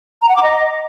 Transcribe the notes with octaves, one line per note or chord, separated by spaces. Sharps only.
A#5
F#5
D6
D#5